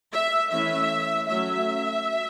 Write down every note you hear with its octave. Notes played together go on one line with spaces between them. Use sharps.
E5
E3 A3 C#4 E5
F#3 A3 C#4 E5